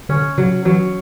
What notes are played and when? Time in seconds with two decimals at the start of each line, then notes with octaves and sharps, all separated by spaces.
0.09 D3 C#4
0.38 C#3 F#3
0.65 E3 F#3